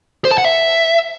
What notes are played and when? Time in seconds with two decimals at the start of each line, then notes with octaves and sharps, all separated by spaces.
0.25 C5
0.31 A5
0.38 F#5
0.45 E5